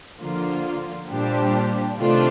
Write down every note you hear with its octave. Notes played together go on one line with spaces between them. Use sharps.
D3 F3 A#3 F4
A#2 G3 D4 G4 C5
C3 D#3 A3 D4 F4